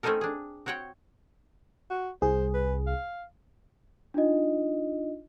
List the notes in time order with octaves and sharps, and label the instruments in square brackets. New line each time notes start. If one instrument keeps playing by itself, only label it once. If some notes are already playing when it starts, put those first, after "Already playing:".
[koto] A3 C4 C#4 D#4 A4 A#4
D4 G#4
C4 F#4 C#5 F#5 G5
[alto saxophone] F#4
[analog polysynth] C2 [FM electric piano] G#4 [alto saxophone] C5
[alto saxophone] B4
F5
[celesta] D4 D#4 F4 D#5